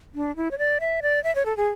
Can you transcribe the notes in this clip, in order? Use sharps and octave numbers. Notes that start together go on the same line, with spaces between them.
D4
E4
C#5
D5
E5
D5
E5
C#5
A4
G#4